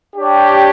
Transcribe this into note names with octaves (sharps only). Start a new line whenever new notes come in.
D4 G4 C#5